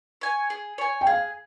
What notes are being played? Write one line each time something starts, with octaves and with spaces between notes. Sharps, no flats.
C#5 G#5
G#4
C#5 G#5
G5
G#4 F5